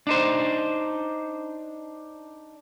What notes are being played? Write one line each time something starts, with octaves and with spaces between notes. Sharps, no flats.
D4 D#4 C5